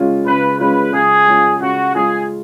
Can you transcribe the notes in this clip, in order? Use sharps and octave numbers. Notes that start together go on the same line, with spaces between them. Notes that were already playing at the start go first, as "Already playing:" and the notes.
Already playing: C#3 G#3 C#4 F4
C#3 B4
G#3 C#4 F4 B4
C#3 G#4
G#3 C#4 F4
C#3 F#4
G#3 C#4 F4 G#4